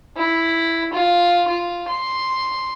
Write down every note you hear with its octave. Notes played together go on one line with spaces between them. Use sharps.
E4
F4
F4
C6